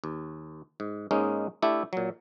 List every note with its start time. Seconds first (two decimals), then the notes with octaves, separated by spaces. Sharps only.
0.04 D#2
0.80 G#2
1.11 G#2 G#3 A#3 C#4 D#4
1.62 A3 D4 E4 G4 A4
1.93 A#2 F#3